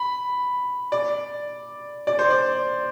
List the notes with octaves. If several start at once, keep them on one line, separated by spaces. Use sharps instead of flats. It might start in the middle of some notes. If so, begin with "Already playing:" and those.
Already playing: B5
D5
D5
C5
D5